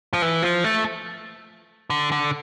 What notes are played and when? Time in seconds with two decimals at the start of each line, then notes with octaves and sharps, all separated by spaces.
0.13 F3
0.22 E3
0.43 F3
0.64 A3
1.90 D3
2.12 D3